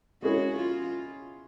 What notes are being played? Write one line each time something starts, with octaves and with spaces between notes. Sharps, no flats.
G#3 C#4 E4 F#4 G#4 C#5
F4